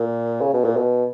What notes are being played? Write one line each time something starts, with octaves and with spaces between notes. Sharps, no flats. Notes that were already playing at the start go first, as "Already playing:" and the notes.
Already playing: A#2
C#3
B2
A#2
B2